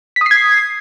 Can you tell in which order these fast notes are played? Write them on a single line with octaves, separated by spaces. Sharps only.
B6 D#6 C7 G#6